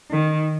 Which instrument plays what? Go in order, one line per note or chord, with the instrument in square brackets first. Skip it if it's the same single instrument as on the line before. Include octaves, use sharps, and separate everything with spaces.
[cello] D#3